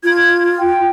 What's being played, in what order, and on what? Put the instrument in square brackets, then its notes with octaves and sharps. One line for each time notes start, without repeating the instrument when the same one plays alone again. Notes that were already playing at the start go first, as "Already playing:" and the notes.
[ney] F4 [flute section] G#6
[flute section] G5